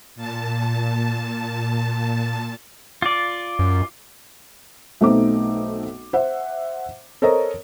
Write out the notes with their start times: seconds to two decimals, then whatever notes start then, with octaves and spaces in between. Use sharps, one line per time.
0.16 A#2 A5
3.02 F4 D5
3.59 F#2
5.01 B1 A3 B3 C4 D#4 D6
6.13 C5 E5 F#5
7.22 A4 A#4 C5 C#5 D#5 A#5